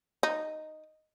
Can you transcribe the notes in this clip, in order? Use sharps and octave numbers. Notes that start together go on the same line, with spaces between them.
D#4